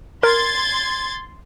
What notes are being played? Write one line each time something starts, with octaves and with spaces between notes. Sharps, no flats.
A#4 C6 G#6 A6